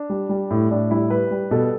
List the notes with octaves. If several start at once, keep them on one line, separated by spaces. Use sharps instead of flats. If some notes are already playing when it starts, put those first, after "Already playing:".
Already playing: D4
G3
G3
A2
A2 D4
G3 E4
G3 B4
G3
B2 A4